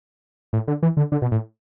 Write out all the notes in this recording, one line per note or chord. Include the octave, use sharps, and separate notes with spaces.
A2
D3
E3
D3
D3
B2
A2